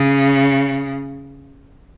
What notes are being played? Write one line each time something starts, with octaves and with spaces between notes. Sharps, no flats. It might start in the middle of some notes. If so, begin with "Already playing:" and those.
Already playing: C#3